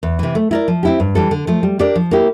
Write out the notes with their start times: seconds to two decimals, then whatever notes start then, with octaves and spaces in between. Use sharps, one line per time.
0.03 E2
0.19 C3 E3
0.35 A3
0.51 E4 A#4 D5
0.68 F3
0.83 C4 E4 G4
1.00 G2
1.15 E3 G3 D4 A4
1.31 D3
1.47 F3 A3
1.63 G3
1.79 D4 G4 A#4 D5
1.96 F3
2.11 A#3 E4 G4